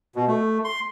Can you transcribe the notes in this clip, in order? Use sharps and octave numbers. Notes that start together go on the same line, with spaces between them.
B2
A3
C6